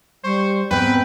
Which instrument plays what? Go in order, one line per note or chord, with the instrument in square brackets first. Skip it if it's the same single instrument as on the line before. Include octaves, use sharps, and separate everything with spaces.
[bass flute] G3 [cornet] C5 [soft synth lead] C#6
[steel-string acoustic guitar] G#2 C4 [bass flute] B3 [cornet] B4 [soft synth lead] G5